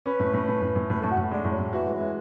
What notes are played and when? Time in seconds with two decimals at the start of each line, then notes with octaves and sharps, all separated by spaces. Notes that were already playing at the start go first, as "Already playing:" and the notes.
0.05 C#4 B4
0.20 A2
0.34 A2
0.48 A2
0.62 A2
0.76 A2
0.90 A2 B4
1.00 A2 A4
1.10 F#4
1.18 A2
1.32 G#3 D4
1.45 A2
1.51 F#3
1.59 A2
1.73 E3 F#4
1.87 G#3
1.93 E3
2.01 G#3